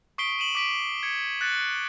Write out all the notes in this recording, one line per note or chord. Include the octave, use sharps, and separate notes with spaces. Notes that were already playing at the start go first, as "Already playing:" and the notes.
C#6 D#6 B6 C7 D7 G7
D#7 E7 F#7
D6 B6 D7
G#6 C#7
F#6 A6 C#7